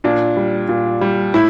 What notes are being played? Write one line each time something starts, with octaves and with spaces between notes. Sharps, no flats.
A#2 D4
G3
A#2
G3
A2 E4